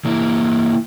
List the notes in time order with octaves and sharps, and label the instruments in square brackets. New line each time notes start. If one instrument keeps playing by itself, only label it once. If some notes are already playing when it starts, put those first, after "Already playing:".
[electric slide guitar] E3 A#3 E4 A#4